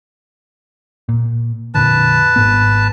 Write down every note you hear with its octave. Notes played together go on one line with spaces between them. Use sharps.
A#2
F2 A#2 D3 B4 A5
G#1 G#2 B3